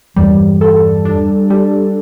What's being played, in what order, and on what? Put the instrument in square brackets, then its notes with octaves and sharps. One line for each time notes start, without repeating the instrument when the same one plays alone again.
[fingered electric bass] E2 G2 [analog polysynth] G3
[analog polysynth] A4
D4
G3